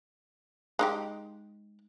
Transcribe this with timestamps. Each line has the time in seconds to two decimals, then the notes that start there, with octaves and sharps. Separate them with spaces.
0.79 G#3 D#4 G4